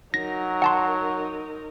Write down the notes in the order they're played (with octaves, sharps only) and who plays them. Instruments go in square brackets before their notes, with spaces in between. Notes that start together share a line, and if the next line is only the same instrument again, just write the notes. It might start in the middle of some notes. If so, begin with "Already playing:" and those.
[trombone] F#3 [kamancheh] D#4 A#4 [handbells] A#6
[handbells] F#5 A5 C6